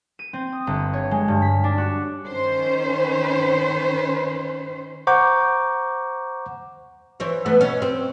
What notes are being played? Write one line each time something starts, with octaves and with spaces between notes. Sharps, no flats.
D#7
C4
D#6
G1
C#5
G#3
G2
B6
D4
F#4
D#3 C#4 C5
C5 F#5 A#5 C#6 D6 G6
E3 C5 C#5
E3 A3 B3
B2 C#4
C4